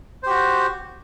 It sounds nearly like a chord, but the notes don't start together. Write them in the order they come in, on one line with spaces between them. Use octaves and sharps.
C5 G4 F#4